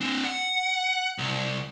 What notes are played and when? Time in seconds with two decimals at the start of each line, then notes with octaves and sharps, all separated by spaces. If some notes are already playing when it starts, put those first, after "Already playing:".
0.01 C4 D4
0.24 F#5
1.18 C2